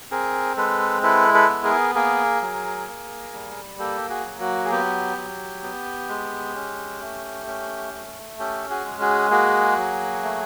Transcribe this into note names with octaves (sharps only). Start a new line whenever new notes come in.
C4 G#4 A#4
G#3 A4 B4
E4 A4 B4
A4 B4
B3
G#4 A#4
A#3 G#4 A#4
F#3
A#3
G3
A#3 G4 A4
F#4 G#4
F#3
F#4
G#4
B3 G4
F#3
B3
G#3
C#4
A3
C#4
A3
C#4 G4 A4
F#4 G#4
G#3
F#4 G#4
A#3 F#4 G#4
F#3
A3